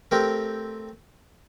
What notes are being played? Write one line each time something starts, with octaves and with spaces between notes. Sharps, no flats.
A3 C4 G4 A#4